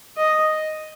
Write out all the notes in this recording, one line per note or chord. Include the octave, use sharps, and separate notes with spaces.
D#5